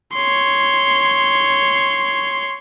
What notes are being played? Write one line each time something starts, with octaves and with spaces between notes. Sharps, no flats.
C#5 C6